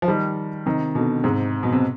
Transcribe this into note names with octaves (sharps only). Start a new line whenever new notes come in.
F3
D#3 G3
C3 D#3
B2 D3
G#2 C3
B2
C3